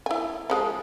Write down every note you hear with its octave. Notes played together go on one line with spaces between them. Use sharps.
E4 G#5
F3 G#3 C#4